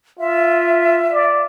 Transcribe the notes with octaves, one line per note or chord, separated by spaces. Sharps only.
F4 E5
D5